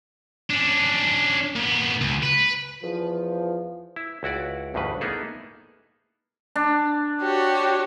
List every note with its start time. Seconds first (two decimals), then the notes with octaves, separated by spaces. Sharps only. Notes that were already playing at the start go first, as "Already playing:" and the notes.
0.50 C#4 D4
1.56 A#2 B3
2.01 C#2
2.23 B4
2.83 E2 F3
3.96 E4
4.23 C#2 E4 F#4 D5
4.74 A1 D2 G2 C#3 B4
5.01 A#3 B3 D#4 E4 G#4 A4
6.56 D4
7.21 F#4 G4 C#5